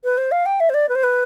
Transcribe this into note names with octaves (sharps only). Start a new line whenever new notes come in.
B4
C5
F5
G5
E5
C5
D5
B4
C5
B4